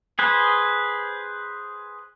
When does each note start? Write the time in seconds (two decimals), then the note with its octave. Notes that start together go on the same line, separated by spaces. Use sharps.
0.19 G#4 B4 C5